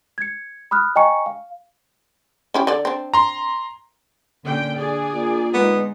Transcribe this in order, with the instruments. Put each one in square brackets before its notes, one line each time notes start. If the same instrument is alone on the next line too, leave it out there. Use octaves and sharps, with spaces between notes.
[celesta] G#6 C#7
B5 D#6 F6 F#6
D#5 G5 G#5 A#5 C#6 C#7
F5
[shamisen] C#4 E4 G4
D3 D5
C4 D4
[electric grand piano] A#5 C6
[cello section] A#2 D3 C#4 [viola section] G5
[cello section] D4 [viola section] G#4 D5
[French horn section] A#3 F4
[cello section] G#3 D#4 [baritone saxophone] B3